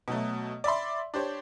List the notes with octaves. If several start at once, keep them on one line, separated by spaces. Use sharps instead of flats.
B2 F#3 A3
D5 E5 B5 C6
D4 G4 C5 C#5